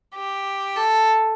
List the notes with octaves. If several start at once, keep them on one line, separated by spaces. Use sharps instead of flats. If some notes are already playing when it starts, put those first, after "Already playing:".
G4
A4